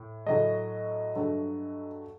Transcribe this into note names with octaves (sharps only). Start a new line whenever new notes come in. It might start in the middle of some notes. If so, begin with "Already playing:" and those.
Already playing: A2
A2 F#3 A3 D#5
G2 F#3 A3